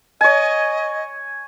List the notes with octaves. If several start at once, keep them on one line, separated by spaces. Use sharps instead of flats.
C#5 D#5 G#5